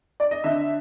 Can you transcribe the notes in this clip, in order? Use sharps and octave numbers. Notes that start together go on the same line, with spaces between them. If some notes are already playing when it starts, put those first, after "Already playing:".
D5
D#5
D3 E5